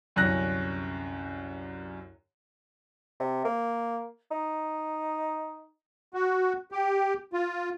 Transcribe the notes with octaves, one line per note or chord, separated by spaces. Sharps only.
C2 F#2 D3 C#4 F#6 A#6
C3
A#3
D#4
F#4
G4
F4